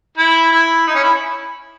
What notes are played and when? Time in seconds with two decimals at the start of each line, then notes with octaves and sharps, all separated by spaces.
0.18 E4
0.52 E4
0.87 D#4
0.95 C#4
1.03 E4